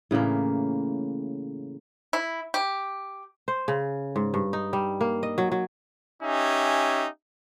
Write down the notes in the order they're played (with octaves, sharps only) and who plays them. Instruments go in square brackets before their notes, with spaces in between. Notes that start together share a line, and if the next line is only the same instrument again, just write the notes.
[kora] A2 C#3 E3 A#3
[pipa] E4
G4
[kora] C5
C#3
G#2
G2
D#4
G3
A#3
D#5
F#3
F#3
[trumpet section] C#4 D#4 G4 E5 G#5